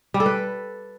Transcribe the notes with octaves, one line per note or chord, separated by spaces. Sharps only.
G3
A4
B4